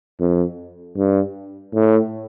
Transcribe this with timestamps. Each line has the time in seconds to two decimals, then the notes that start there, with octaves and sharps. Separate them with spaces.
0.20 F2
0.97 G2
1.74 A2